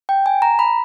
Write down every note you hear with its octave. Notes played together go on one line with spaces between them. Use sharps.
G5
G#5
A#5
B5